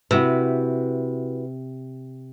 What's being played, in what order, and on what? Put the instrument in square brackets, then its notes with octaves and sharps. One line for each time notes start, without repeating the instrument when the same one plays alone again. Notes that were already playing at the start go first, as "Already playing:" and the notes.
[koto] C3 [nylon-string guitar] E4 F#4 B4